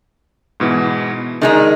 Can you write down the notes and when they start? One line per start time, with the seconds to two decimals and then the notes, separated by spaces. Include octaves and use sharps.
0.60 G#2 B2 E3
1.42 D#3 G#3 D4 D#4